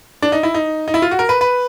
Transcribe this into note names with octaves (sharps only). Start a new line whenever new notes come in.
D4
D#4
E4
D#4
D#4
E4
F4
F#4
A#4
B4
B4